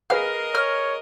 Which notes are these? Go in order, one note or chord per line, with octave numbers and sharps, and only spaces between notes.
G#4 A#4 B4 D#5 F5 F6
C#5 F6